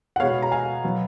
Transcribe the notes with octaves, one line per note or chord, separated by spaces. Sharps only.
F#5
B2 G#3 B3 C#5 F5
A#5
F5 G#5
B2 F#3 B3